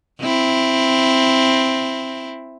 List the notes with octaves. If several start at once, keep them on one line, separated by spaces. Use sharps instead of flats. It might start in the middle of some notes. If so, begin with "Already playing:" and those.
C4 E4